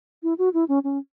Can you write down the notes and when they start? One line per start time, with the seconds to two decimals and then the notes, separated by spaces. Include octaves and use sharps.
0.23 E4
0.38 F#4
0.54 E4
0.68 C#4
0.84 C#4